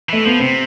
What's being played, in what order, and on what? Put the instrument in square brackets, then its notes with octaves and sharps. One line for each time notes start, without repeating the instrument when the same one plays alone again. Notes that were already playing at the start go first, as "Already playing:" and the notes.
[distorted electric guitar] E3 [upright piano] A3
[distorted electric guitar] F3 [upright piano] B3
[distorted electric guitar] C3 [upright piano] C4